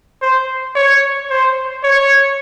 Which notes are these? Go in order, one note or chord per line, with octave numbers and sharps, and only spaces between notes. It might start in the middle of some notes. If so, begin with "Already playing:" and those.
C5
C#5
C5
C#5